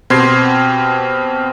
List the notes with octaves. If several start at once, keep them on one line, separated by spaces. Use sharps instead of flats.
B2 C4 G4 C6 G#6 C7